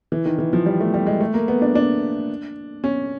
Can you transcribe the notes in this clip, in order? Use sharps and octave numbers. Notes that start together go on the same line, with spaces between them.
E3
D#3
E3
F3
G3
A3
G3
G#3
A3
A#3
B3
D4
D4
C#4